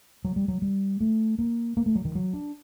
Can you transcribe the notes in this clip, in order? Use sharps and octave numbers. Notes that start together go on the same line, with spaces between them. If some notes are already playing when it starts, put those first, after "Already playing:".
F#3
G3
F#3
G3
A3
A#3
A#3
A3
F#3
D#3
F#3
D4